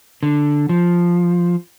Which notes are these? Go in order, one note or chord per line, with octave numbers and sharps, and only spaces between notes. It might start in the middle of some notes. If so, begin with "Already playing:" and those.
D3
F3